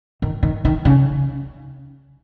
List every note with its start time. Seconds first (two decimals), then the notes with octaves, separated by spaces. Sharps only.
0.22 D#3
0.43 D#3
0.65 D#3
0.85 C#3